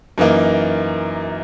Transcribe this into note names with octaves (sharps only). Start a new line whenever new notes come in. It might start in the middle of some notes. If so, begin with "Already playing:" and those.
F#2 E3 A#3 D#4